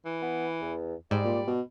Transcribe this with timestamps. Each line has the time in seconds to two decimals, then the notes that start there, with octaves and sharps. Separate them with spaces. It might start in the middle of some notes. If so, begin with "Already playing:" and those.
0.05 E3
0.22 B3
0.62 E2
1.11 G#2 G3 D5
1.25 A#2
1.47 B2